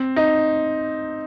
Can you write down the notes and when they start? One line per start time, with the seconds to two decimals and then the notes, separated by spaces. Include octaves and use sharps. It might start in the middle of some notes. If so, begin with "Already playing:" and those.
Already playing: C4
0.16 D#4